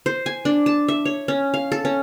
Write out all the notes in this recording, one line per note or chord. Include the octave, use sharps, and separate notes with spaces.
C5
G#5
D4
A5
E5
C#5
C#4
F5
A4
C#4